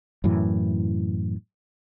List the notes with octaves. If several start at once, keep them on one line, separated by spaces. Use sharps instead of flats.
F#2 A2 E3